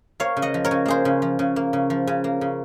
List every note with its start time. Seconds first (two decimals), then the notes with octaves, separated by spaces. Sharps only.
0.20 A#3 C#5 F5
0.37 C#3
0.42 D#5 F#5
0.54 F3
0.64 A#4 C#5
0.71 C#3
0.86 A#3 G#4 C5
1.05 C#3
1.22 F3
1.39 C#3
1.56 A#3
1.73 C#3
1.90 F3
2.07 C#3
2.24 A#3
2.41 C#3